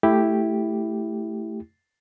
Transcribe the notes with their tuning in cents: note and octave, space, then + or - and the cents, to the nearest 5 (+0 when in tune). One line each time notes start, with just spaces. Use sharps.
A3 +0 E4 +0 G4 +0